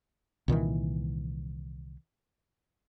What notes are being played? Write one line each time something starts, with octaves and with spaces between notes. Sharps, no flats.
C2 A#2 D#3 E3